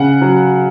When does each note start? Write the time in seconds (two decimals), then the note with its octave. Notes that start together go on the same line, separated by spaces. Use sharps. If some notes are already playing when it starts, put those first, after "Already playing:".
Already playing: C#3 F#5
0.22 F#3